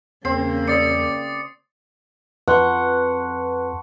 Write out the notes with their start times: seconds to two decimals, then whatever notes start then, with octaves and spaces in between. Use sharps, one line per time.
0.25 E2 C#3 A#3 C4 C7
0.68 D5 D#6 A6 C#7
2.48 F2 B4 F#5 A5 C6 C#6